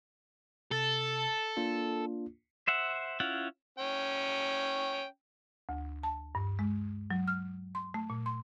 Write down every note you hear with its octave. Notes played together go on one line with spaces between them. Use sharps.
C3 A4 A6
A#3 D4 F4
C5 E5 F#5
C#4 E4 F4 F#5
C#4 G5
D2
A5
G2
G#3
F#3
F6
C6
A3
A#2
C6